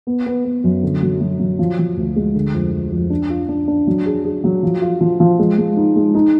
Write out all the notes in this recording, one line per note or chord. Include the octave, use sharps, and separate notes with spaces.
B3
B3
B3
F#2
D3
F#3
F#3
F#3
F3
F3
D2
G#3
D3
F2
F2
F2
D4
F4
D4
D4
F#3
G#4
G#4
F#3
F3
F4
F3
F3
G#3
G#3
D#4
G#3
D#4